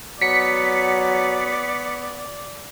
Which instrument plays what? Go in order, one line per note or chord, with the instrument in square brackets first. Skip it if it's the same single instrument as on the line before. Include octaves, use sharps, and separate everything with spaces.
[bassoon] F#3 [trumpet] B3 [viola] D5 [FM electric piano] B6 C#7